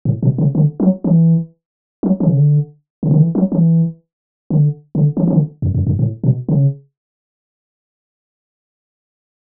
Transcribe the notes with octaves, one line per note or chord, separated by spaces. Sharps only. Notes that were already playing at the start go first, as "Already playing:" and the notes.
A2
B2
C#3
D3
F#3
E3
F#3
E3
C#3
D3
C#3
D3
E3
F#3
E3
D3
C#3
D3
E3
E3
D3
F#2
F#2
G2
A2
B2
C#3